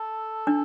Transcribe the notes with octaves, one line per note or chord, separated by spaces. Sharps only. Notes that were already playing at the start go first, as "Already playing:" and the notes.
Already playing: A4
D4